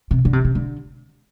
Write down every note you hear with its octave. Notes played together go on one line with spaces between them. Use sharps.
C3
D3
C3
C3
D3